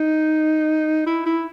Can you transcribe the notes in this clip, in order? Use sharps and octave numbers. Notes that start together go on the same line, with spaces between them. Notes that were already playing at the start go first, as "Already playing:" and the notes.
Already playing: D#4
E4
E4